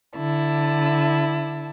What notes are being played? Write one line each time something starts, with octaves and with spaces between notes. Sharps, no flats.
D3 E4 A5